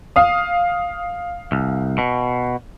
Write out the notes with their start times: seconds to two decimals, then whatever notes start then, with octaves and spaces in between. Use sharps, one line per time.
0.16 F5 D#6
1.52 C2
1.98 B2